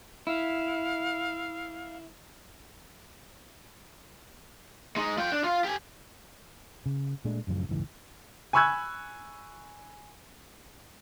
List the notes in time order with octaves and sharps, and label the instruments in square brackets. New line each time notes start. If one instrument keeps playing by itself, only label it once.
[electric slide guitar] E4 [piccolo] F5
[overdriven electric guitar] G#3 D#4
F4 G5
D4
F4 F5
G4 G#5
[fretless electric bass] C#3
A#2 G#3 A3 D4
A1 F#2 C#3 F3
F#1 C#2 G#2 E3
[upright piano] G#5 B5 C#6 E6 F#6 G#6